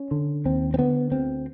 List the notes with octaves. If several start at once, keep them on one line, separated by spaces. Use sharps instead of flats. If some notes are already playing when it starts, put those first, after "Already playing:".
Already playing: C#4
D3
D#2 C4
C4
D3 B3
D2 C4